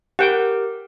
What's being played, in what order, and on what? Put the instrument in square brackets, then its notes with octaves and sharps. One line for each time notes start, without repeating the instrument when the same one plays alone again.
[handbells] G4 A#4 [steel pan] F#5 G5